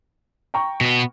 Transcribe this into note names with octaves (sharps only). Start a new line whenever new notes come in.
G5 A#5 C#6
B2 B3